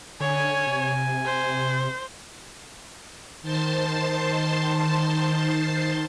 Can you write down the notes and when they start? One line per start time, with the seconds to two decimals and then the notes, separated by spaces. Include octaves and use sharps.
0.20 D3 C#5 G#5
0.67 C3
1.25 C5
3.42 D#3 C5 A5 C6